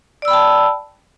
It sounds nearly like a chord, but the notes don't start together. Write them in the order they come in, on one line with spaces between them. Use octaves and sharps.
D5 E6 B5 G5 A5